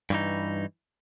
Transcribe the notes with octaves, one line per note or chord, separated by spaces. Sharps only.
G2 E3 D#4